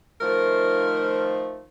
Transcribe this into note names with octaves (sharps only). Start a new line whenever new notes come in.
D#3 F3 A3 A#4